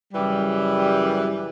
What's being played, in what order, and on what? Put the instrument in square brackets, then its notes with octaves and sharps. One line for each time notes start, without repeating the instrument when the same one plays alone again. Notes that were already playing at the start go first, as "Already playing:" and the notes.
[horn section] F#2 C#3 E3 G3